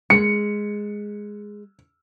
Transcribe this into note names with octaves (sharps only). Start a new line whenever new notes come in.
G#3 C#7